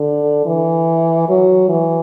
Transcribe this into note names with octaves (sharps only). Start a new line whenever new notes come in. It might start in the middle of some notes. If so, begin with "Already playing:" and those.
Already playing: D3
E3
F#3
E3